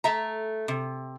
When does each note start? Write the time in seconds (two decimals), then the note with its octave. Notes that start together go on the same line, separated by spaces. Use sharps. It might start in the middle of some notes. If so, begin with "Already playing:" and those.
0.04 A3 E5 A#5
0.68 C3